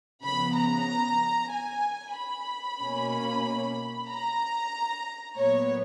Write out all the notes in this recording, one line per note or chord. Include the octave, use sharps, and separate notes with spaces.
C#3 F3 B3 B5
A#5
G#5
B5
B2 A#3 C#4
A#5
A#2 F#3 B3 C#5